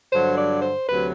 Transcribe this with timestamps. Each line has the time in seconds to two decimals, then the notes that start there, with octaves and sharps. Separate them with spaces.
0.12 G2 D3 F#3 C5
0.37 D5
0.62 C5
0.89 D2 C3 F#3 B4